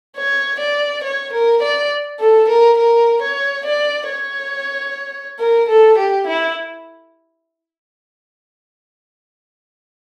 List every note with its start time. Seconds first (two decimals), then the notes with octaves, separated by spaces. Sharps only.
0.17 C#5
0.60 D5
1.04 C#5
1.33 A#4
1.63 D5
2.20 A4
2.49 A#4
2.78 A#4
3.22 C#5
3.66 D5
4.09 C#5
5.40 A#4
5.69 A4
5.98 G4
6.27 E4